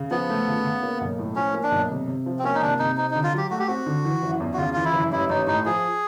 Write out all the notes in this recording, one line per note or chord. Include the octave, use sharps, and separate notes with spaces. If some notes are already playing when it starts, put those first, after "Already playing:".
Already playing: C#3
F3 B3
A3
C#3
C#3
A#3
B1
A2
F3 C#4
A#3
D4
B1
C3
C3
F3
C4
A#3 C#4
D#4
C3 D4
C3 D#4
C4 D#4
D3 D#4
F4
F#3 G4
A3 F#4
G4
C4 F#4
D3
E3
F#1
E2
F#4
C#3 F4
E3 F4
E4
F#1
A1 E4
A1 D#4
A2 D#4
F3 G#4